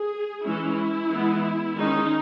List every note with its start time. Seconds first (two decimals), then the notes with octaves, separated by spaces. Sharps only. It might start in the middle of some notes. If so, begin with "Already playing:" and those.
Already playing: G#4
0.45 E3 G#3 C#4 E4
1.11 E3 G#3 B3
1.77 D#3 G#3 C#4 D#4